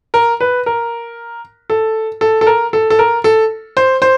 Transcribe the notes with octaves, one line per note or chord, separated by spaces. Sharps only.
A#4
B4
A#4
A4
A4
A4
A#4
A4
A4
A#4
A4
C5
C5